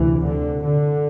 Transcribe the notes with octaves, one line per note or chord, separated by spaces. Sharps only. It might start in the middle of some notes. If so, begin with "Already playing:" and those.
Already playing: D2 C3 E3
D3
D3